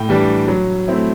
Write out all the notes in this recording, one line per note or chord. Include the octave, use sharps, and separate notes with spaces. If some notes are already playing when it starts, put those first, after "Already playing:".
Already playing: A2 G5
E3 G3 D4
F#3
A3 C4 E4